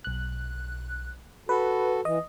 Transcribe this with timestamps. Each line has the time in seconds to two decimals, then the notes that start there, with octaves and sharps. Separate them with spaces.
0.04 B1 F#6
1.49 F#4 A4 B4
2.05 E3 D#5